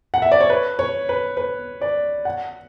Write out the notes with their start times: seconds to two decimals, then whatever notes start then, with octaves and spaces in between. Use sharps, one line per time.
0.14 F#5
0.22 E5
0.32 D5
0.41 C#5
0.50 B4
0.79 C#5
1.09 B4
1.37 B4
1.81 D5
2.25 F#5